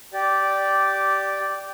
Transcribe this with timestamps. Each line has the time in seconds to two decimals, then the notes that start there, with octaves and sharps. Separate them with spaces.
0.13 G4 D5